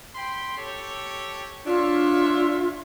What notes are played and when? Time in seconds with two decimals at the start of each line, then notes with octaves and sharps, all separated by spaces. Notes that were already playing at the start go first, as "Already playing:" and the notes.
0.15 G5 B5 C6
0.57 G4 A4 C#5
1.66 D4 F4 C#5 E5